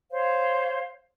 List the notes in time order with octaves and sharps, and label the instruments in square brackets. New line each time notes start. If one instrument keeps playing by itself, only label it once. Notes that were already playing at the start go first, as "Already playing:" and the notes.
[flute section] C5 C#5 F5